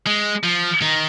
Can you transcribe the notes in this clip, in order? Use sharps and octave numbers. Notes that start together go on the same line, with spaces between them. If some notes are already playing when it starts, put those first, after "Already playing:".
G#3
F3
D#3